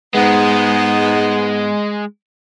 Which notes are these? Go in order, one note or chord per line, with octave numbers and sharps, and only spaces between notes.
G#2 G#3 B3